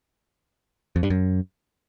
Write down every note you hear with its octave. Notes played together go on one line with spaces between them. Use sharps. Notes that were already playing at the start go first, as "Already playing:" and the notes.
F2
G2
F#2